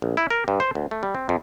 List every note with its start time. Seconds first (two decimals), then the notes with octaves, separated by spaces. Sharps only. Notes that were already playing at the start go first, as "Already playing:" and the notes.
0.02 A#1
0.17 E4
0.30 A#4
0.48 G2
0.60 C5
0.75 D2
0.91 A3
1.03 G3
1.15 C4
1.29 F2